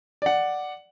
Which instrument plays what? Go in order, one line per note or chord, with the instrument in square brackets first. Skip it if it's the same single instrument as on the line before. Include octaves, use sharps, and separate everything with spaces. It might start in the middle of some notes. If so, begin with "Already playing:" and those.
[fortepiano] D5 F#5